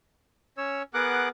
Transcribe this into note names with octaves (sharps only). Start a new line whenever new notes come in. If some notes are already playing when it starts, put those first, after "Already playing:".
C#4 C#5 E6
B3 G#4 A#4 F#5 D6 F#6